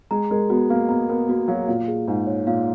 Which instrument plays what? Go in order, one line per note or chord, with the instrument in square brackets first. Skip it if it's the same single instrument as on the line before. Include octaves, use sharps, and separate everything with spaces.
[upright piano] G#3 [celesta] A#5
[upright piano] G#3 [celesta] A#4
[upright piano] B3 [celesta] F#4
[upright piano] A#3 [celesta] F5
[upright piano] B3 [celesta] A#5
[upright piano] B3 [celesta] A#4
[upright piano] A#3 [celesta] F#4
[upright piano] F#3 [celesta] F5
[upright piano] A#2 [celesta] F5
[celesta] G#4
[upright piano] G#2 [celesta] D#4
[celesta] C#5
[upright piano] A#2 [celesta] F5